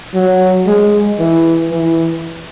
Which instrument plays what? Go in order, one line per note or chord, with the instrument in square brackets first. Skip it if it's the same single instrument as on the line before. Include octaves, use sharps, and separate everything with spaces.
[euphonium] F#3
G#3
E3
E3